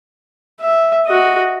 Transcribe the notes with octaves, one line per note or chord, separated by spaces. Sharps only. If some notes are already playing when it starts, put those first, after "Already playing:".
E5
F#4 D#5